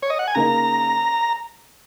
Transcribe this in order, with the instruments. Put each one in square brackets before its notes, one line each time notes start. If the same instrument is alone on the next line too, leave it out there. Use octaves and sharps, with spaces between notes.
[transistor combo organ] C#5
D#5
F#5
G#5
[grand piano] C#3 A#3 D#4 [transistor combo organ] A#5